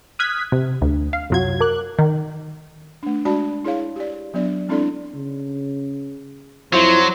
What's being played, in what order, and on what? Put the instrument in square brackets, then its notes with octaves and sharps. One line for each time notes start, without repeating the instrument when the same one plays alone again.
[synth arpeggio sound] D#6 F6 F#6 G#6 B6
C3
D2
F5
C2 F#2 F#3 F4 G#6
A#4 D6 F#6
[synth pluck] D#3
[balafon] A3 D4
G#3 D4 F#4 D5 A5 B5
E4 G#4 C#5 F5
G4 D5
F#3 B3 D4 D5
G#3 C4 D4 E4 A4 D5
[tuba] C#3
[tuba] F2 [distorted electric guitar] F#3 [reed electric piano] E4 F4 [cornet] C5